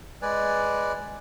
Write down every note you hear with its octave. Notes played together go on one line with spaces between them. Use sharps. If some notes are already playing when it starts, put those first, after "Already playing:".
G#3 B4 D5 G#5